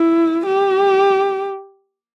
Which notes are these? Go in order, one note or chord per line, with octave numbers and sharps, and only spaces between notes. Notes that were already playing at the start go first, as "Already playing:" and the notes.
Already playing: E4
G4